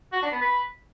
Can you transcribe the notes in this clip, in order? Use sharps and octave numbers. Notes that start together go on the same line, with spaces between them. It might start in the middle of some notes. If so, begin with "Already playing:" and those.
F#4
D4
B3
B4